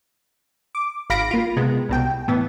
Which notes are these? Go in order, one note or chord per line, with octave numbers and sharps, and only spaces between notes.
D6
G#1 F5 B5 A#6 D7
A#3 F4
C3 G#3 B3
C2 B2 G5
A2 E3 B3